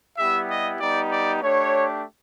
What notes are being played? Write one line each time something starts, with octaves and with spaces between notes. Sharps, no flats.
G3 B3 E4 G4 E5
D#5
G3 B3 D#4 G4 D5
D5
A3 D4 G4 C#5